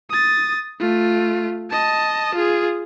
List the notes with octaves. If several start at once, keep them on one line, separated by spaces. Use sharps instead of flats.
D#6 A6
A3 F4
D#5 A5
F4 G#4